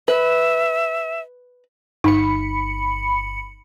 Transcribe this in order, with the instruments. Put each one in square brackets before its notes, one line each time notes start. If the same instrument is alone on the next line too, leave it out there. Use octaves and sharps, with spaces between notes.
[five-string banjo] B4 [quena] E5
[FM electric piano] G1 B5 C#7 [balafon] D#4